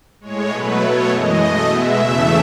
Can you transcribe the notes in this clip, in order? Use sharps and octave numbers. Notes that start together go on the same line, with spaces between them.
A2 G#3 C#5
B2 F#3 A3 B4
B2 A3 C#5
F#2 E3 G#3 D#5
B2 A3 D#5
B2 G#3 E5
E2 C#3 E3 A3